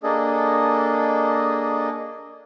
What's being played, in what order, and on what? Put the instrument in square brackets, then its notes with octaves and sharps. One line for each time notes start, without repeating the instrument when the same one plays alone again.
[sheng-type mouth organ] A#3 D4 G#4 A4 D#5